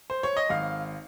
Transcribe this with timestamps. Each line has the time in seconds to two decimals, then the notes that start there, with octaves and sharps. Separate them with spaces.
0.10 C5
0.23 C#5
0.37 D#5
0.49 G#1 F5